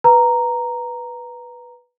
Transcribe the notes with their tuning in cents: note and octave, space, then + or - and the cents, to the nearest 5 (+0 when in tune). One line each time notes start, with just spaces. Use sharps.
B4 -5 A#5 +0